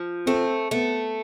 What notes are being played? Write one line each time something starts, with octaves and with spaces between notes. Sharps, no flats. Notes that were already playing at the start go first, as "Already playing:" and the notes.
Already playing: F3
A3 C4
A3 B3